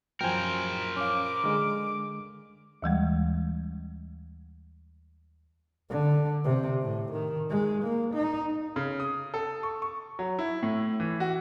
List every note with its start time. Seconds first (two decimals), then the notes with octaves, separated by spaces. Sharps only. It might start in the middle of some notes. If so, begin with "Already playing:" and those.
0.21 F#2 F3 A#4 C5 G5 G#5
0.96 C#4 F5 D6
1.44 D3 G#3 F6
2.82 D#2 E3 G3 G#3
5.90 D3
6.44 C3
6.82 A2
7.12 D#3
7.50 G#3
7.83 A#3
8.14 D#4
8.76 C#3
9.00 D#6
9.34 A4
9.63 C#6
9.82 C#6
10.19 F#3
10.39 E4
10.63 A2
11.00 E3
11.20 F#4